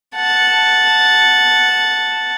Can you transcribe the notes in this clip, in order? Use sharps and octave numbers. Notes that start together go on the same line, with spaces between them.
F#5 A5